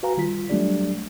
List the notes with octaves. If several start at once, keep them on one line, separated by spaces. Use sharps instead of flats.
F#4 B4 F5 G#5 A#5
D#3 G3 F4 B6
F#3 G3 A3 D4 G4 D5